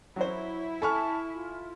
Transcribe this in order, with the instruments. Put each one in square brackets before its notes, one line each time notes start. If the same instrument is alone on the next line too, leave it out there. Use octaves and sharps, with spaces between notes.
[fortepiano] F#3 F#4 C5 [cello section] E4 [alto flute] C#5
[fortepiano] A4 [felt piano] G#5 C#6 F6 [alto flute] A5
[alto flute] F4